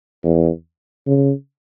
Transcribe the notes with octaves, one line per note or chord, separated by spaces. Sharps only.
E2
C#3